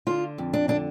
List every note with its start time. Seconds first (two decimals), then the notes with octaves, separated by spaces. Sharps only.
0.07 D3 F4
0.38 F2
0.53 D4
0.68 D3 D4